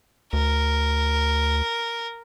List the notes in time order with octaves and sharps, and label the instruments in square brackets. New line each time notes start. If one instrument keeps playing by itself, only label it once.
[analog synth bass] D2 [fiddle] A#4